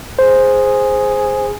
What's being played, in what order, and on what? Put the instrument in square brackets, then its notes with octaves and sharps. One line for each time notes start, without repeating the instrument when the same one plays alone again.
[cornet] G#4 [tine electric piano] C5